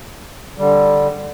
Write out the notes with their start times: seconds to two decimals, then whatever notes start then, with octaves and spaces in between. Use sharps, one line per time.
0.58 D3 G3